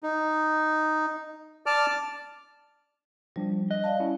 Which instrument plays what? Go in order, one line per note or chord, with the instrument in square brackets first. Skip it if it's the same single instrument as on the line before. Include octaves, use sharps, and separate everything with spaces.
[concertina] D#4
D5 A5 D6 F6
[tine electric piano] F3 D4 [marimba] G3
[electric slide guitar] D#5 [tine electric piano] F#6
[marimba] D5 F5 A5
[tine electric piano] C#4 E4